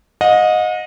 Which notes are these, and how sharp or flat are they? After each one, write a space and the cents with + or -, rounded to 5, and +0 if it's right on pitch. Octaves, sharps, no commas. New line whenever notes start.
D#5 +0 F#5 -45